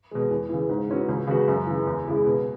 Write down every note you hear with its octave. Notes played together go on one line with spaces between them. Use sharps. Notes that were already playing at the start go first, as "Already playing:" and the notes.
B2 G#3
E2
C#3 E3
G#2
E3 C#4 F#4
C#2
C#3 G#3 B3 F#4
F#2
C#3 E3
E2
C#3 G#3 E4 G#4
B2